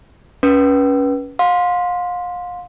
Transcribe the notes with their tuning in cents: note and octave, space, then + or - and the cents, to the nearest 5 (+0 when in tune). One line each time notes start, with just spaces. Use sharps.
C#4 +15 B4 -20
F5 +35 C6 +0